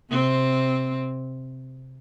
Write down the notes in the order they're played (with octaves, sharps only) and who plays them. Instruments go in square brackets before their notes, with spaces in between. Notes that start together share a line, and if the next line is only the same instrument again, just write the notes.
[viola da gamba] C3 C4